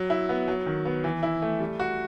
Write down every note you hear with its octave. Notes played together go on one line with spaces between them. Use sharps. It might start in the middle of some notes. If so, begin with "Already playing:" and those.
Already playing: F#3
E4
B3
F#3
D#3
B3
E3
E4
A3
G3
F#4